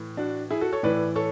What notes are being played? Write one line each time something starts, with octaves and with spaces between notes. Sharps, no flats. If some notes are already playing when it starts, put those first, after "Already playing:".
Already playing: A2 E3
D4 F#4
E4 G#4
F#4 A4
A4 C#5
A2 E3 B4 D5
A4 C#5